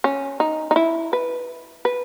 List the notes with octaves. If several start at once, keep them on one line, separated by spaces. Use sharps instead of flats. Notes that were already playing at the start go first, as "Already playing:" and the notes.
C#4
D#4
D#4
E4
B4
B4